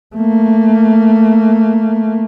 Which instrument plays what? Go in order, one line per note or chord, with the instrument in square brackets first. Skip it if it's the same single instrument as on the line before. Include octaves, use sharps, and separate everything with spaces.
[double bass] A3 A#3